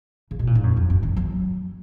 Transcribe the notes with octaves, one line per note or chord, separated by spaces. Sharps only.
C#3
B2
A#2
G#2
F#2
F2
F#2
D#3
F#3